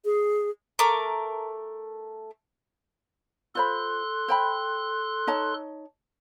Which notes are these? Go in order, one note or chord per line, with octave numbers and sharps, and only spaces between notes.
G#4
A3 A#4 D6
F4 A4 C5 B5 C6 F#6
C5 G5 B5
D#4 C#5 A5